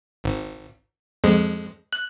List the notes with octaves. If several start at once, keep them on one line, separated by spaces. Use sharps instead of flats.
G#1
F2 G#3
F#6